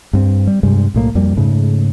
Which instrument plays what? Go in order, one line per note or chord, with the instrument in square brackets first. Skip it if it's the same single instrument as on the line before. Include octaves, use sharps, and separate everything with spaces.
[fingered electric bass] G2 B3 C4
G3
G2 C3 G3 G#3
B1 A2 A#3
F2 G3 A#3
G#2 C#3 A3